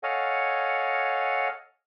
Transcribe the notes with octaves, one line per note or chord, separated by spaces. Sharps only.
A4 C#5 D#5 F5 F#5 G#5